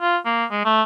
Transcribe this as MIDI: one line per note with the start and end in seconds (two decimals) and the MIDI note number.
0.01 0.17 65
0.25 0.45 58
0.51 0.60 56
0.65 0.82 57